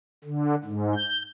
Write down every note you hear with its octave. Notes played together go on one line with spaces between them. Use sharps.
D3
G#2
G6